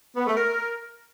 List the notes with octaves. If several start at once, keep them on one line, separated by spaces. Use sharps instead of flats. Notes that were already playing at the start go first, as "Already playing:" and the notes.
B3
A3
A#4